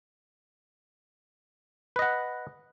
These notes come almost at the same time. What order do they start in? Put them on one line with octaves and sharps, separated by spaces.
B4 D#5 F#5